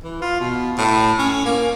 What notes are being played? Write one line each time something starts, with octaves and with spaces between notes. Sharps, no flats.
E3
F4
B2
A2
C#4
A#3